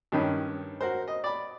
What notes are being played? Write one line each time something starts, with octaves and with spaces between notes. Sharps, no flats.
G2 D#3 C#4
F#4 A#4 C5
D#5
D5 B5